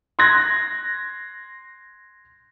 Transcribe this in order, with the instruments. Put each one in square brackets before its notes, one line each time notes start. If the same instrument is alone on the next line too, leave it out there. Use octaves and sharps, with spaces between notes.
[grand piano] C6 F#6 G#6 A#6